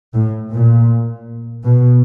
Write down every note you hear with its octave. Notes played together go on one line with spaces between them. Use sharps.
A2
A#2
B2